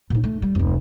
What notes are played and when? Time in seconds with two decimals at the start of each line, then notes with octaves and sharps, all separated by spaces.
0.10 A#2 D#4
0.24 A3
0.42 G3
0.55 F1 D2